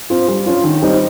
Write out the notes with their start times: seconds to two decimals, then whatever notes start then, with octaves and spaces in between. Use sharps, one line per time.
0.10 C4 F4
0.28 G3
0.46 C#4 F4
0.64 D#3
0.82 G3 C4 D#4